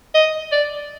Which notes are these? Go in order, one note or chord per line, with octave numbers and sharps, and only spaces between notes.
D#5
D5